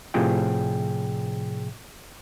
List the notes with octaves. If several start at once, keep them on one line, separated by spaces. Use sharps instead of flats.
A2 C3 F3 G#4 G5